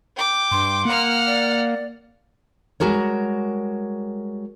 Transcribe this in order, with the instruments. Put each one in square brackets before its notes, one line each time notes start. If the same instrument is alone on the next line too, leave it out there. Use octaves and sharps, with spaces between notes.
[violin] G5 D6
[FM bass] G2 [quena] C6
[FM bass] A#3 [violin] F#5 F6
[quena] D5
[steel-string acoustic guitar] G3 G#3 F#4 A#4 C#5